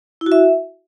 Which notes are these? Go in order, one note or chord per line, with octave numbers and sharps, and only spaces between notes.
E4
F#4
E5